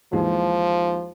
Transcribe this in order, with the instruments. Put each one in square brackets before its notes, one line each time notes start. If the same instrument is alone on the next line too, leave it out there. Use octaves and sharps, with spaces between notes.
[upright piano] D#2 E3 G#3 [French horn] F3